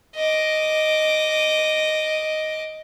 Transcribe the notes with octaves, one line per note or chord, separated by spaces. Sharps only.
D#5 D6